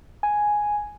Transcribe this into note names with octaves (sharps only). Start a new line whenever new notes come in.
G#5